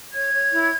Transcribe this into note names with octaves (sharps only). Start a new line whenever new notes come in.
C#5 G#6
C#5
E4